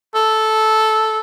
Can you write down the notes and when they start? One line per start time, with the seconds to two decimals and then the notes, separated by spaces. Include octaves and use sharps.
0.15 A4